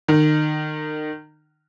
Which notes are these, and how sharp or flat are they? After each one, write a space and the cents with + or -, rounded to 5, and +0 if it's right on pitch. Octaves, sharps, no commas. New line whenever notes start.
D#3 -30